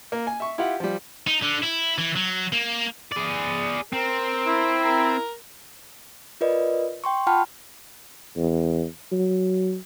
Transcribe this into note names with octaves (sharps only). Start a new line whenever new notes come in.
A#3
G#5
E5 C#6
E4 F4 G4 F5 F#5
F3 G3
D#4
D3
E4
E3
F#3
A#3
G#4 D5
C4 A#4
E4
A#4 A#5
F4 A#4 B4 D5 D#5
G5 C6 C#6
F4 F#5 G5 A5 B5 F6
E2
F#3